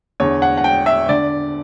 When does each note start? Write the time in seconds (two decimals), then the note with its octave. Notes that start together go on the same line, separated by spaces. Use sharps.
0.20 E2 D3 C#5
0.42 F#5
0.58 F#5
0.64 G5
0.86 E5
1.09 D3 D5